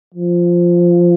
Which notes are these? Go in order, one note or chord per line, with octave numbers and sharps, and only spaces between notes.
F3